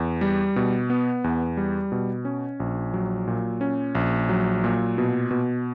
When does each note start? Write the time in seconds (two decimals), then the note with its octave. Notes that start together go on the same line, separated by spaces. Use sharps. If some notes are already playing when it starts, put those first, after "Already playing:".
Already playing: E2
0.21 G3
0.56 B2
0.90 B3
1.24 E2
1.57 G3
1.92 B2
2.25 C#4
2.60 A#1
2.94 F#3
3.27 A#2
3.61 C#4
3.95 A#1
4.29 F#3
4.64 A#2
4.98 B2
5.31 B2